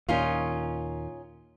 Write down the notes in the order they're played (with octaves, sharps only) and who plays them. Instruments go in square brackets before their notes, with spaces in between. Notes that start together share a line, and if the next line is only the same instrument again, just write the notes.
[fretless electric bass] D#2 A#2 [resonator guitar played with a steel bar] C#4 D#4 F4